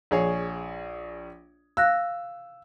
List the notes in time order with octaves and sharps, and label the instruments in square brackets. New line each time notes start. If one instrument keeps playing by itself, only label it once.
[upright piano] A#1 G#4 C#5
[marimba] F5 F#6 A#6 [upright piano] E6